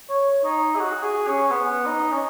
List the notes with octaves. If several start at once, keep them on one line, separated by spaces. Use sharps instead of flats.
C#5
D#4
G#4
F#4
G#4
C#4
B3
D#4
C#4